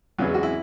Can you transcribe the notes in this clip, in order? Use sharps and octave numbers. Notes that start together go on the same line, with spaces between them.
E2 C#3 E3 F#3
G#3
F#4
E4